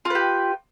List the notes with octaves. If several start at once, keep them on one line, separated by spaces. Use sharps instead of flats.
F4 G4 B4